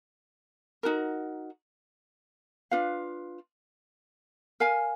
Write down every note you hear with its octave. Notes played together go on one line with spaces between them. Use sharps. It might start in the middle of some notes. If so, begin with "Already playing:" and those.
D#4 F#4 A#4
D4 F4 B4 F5
A#4 F5 G#5